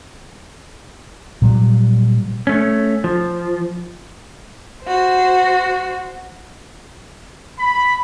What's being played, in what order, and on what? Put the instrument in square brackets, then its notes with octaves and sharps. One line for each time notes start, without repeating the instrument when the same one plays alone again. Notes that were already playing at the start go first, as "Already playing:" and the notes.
[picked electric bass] A#2 F#3 G3
[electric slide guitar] A3 C#4
F3
[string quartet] F#4 C5
[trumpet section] B5